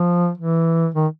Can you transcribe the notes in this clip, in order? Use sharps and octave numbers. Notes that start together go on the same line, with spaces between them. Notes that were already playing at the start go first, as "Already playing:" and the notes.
Already playing: F3
E3
D#3